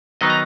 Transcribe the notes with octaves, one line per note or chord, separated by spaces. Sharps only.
D#3 F#3 B3 D#4 D#5
A#5